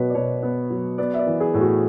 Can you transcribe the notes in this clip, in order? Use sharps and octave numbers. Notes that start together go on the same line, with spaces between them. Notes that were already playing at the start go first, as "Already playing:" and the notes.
Already playing: B2 F#3 B3 B4 C#5
D5
B2 C#5
B3
F#3
B3 D5
E5
D5
E3
G#4
A2
F#4